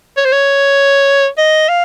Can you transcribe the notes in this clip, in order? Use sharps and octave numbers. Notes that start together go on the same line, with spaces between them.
C#5
C5
C#5
D#5
F5